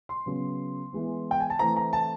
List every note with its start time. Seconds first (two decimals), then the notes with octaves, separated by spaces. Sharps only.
0.09 C6
0.26 C#3 F#3 B3
0.93 E3 G#3 B3
1.31 G5
1.40 G#5
1.50 A5
1.59 E3 A3 C4 A#5
1.76 A#5
1.93 A5